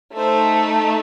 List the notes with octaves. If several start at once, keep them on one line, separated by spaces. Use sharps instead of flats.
A3 D#4 A4 C5